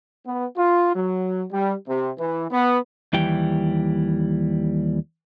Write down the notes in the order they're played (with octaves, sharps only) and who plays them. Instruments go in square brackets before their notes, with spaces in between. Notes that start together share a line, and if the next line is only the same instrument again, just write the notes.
[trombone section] B3
F4
F#3
G3
C3
E3
B3
[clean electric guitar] D#2 E3 G3 G5